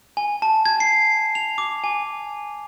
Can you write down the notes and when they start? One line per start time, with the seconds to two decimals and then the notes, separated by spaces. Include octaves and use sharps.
0.17 G#5
0.42 A5
0.65 G#6
0.80 C7
1.35 F7
1.58 D6
1.84 G#5